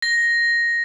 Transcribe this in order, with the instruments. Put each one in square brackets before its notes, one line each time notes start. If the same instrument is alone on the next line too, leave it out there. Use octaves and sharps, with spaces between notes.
[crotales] A#6